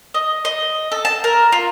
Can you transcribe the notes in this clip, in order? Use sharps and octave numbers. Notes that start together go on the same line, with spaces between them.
D#5
D#5
A4
A5
A#4
F4